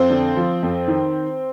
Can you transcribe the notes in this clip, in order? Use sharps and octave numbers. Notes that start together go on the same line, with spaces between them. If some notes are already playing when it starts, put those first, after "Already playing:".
Already playing: F2 C4 C5
D3
F3
F2
D#3